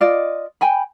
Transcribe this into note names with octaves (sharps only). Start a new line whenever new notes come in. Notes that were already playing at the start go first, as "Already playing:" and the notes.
F4 D5 D#5
G5 G#5 B5